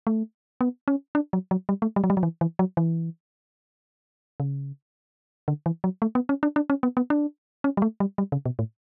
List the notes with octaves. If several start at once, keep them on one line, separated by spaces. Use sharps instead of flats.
A3
B3
C#4
D4
F#3
F#3
G3
A3
G3
F#3
G3
F#3
E3
E3
F#3
E3
C#3
D3
E3
F#3
A3
B3
C#4
D4
D4
C#4
B3
B3
D4
C#4
G3
A3
G3
G3
C#3
B2
A2